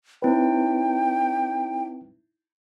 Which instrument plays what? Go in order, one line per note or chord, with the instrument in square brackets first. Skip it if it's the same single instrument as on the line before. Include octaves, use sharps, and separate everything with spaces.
[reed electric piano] C4 B4 [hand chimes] D#4 E4 C#5 [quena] G5